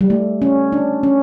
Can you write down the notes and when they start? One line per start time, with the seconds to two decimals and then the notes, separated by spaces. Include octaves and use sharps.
0.01 G3
0.10 A3
0.42 C#4
0.72 D4
1.03 C#4